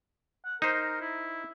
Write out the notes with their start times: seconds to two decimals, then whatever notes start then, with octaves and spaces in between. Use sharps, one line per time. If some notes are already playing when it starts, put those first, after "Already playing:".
0.45 F#5
0.62 D#4 A#4 C5
1.01 E4